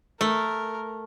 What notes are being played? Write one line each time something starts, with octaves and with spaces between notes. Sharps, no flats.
A3 A#4